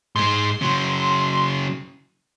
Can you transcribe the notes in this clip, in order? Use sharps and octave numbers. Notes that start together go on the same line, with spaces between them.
G#2 G#3 C6
C#3 F#3